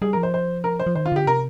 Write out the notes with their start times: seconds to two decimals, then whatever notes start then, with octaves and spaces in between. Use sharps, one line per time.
0.02 G3 G#4
0.13 A#4
0.17 F3
0.23 C5
0.34 C5
0.64 A#4
0.80 C5
0.86 F3
0.95 D#3 C5
1.06 F4
1.12 D3 G4
1.27 C3 A#4